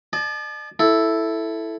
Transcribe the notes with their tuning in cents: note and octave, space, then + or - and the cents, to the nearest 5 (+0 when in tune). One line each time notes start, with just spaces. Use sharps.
D5 +40 A5 -35
E4 +0 A4 +0